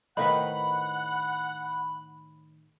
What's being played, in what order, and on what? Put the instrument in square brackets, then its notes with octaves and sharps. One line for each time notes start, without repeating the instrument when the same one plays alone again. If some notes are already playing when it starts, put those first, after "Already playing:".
[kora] A2 D#3 B4 [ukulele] C5 D#5 F5 [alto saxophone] F#5 [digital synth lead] B5